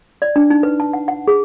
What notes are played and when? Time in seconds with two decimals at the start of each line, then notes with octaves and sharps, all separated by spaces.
0.22 D5
0.36 D4
0.50 D#4
0.63 B4
0.80 A5
0.93 F#5
1.08 F#5
1.28 G#4